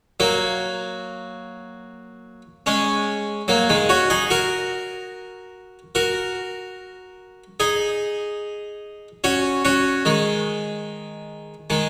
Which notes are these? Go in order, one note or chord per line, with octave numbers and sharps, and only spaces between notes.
F#3 A#3
G#3 C#4
F#3 A#3
D#3 G#3
C#4 F#4
D#4 G#4
F#4 A#4
F#4 A#4
D#4 G#4
C#4 F#4
C#4 F#4
D#3 G#3
D#3 G#3